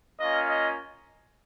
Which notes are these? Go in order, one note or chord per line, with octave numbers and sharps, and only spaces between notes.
A#3 C#4 F4 D#5
D#5